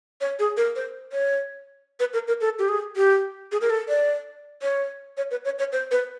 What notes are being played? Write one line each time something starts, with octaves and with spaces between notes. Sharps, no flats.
C#5
G#4
A#4
C5
C#5
B4
A#4
A#4
A4
G4
G#4
G4
G#4
A#4
A4
D5
C#5
C#5
B4
C#5
C#5
C5
B4